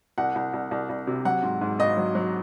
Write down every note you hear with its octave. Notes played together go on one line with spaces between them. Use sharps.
C2 F#5
C2
C2
C2
C2
C3
F#3 F#5
G#2
G#2
G#1 D#5
F#3
F#3